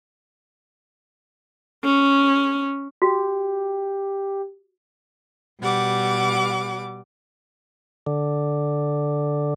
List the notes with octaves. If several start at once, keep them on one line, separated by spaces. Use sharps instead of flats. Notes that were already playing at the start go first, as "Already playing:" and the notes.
C#4
F#4 G4
B2 G3 F#5 D6
D3